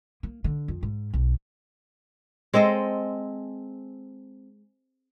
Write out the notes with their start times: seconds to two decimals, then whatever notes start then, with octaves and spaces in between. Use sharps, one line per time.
0.23 A#3
0.44 D3
0.68 F2
0.83 G#2
1.13 B1
2.54 G#3 C4 A4 D#5